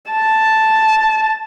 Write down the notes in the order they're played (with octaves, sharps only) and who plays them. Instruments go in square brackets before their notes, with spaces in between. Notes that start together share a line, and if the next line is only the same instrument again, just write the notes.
[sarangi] A5